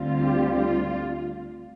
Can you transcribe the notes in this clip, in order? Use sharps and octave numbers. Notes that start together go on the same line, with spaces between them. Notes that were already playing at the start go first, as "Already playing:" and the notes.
Already playing: D2 D3 G3 C4 F4
G4
F4